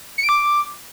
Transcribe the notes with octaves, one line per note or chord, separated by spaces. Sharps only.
C#7
D7
D6